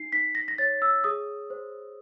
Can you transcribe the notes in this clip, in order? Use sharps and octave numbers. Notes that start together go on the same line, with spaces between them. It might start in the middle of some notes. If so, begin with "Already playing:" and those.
Already playing: D#4 C7
D#4 B6
A#6
A#6
C#5 A6
E6
G#4 D#6
C5